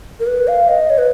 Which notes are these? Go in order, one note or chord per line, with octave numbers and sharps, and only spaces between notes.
A#4
B4
F5
D#5
C#5
B4